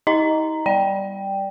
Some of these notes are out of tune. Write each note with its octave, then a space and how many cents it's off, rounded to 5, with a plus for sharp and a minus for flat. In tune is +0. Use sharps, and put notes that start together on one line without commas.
D#4 +40 D#5 +0 A#5 +0
G3 +0 D5 +0 G5 +0